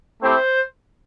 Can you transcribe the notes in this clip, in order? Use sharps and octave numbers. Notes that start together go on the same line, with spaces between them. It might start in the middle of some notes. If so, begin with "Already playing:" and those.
A3 C4 E4 G4 C5